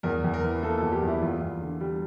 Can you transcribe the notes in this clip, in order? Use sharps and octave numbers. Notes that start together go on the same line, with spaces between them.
E2 A#4
E2
A#4
E3
A#3 A4
A4
E2
G4
E2
E4
E2 F4
E2
D3
G3